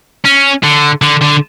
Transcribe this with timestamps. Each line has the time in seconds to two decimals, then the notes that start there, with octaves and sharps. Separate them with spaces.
0.25 C#4
0.63 D3
1.02 D3
1.21 D3